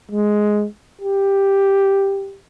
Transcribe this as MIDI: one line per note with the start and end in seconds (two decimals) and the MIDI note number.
0.11 0.66 56
1.02 2.37 67